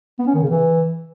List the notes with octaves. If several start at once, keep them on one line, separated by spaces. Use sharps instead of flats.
B3
C#4
D#3
C#3
E3